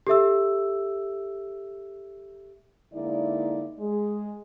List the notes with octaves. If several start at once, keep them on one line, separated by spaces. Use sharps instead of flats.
G4 A4 E5 E6
D3 G#3 A#3 D#4 E4 D5
G#3